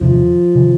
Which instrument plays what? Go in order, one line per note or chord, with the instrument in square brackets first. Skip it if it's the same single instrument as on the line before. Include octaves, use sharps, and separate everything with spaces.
[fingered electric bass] E2 C3 D#3 [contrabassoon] F3
[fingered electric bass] C3 D#3